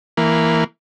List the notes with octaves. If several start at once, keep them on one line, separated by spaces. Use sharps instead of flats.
E3 A#3